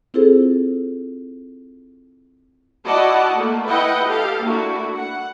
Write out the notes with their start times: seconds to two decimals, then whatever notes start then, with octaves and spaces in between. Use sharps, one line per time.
0.14 C4 E4 F4 G#4 A4 C5
2.86 E4 F#4 D5 D#5 F#5 A5
3.35 A3 A#3
3.66 E4 B4 D#5 F#5 G5
4.07 G4 A4 F5
4.44 A3 A#3 D4 E4 F#4
4.95 F#5